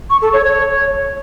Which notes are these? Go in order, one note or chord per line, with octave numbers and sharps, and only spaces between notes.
C#6
A4
C#5
C#5